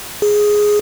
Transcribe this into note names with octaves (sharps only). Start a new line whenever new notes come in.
G#4